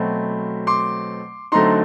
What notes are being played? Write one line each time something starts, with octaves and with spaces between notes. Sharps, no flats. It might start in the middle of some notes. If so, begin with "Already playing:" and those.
Already playing: B2 F#3 A3 C4 B5
C6 D6
D3 F#3 A3 C4 D#4 A#5 C6